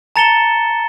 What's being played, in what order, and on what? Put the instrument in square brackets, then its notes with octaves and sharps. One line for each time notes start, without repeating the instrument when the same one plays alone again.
[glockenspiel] A5 A#5 A6 C#7 E7 G7